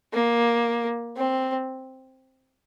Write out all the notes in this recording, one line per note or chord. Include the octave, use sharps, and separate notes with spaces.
A#3
C4